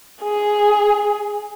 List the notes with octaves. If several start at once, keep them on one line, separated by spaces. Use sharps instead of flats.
G#4